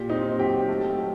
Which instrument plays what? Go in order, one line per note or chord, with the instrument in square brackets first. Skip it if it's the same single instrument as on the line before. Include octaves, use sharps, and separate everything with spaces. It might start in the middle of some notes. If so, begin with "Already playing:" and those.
Already playing: [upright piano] A#2 G4
C4 D#4 D#5
F#3 G4 G5
A3
F#3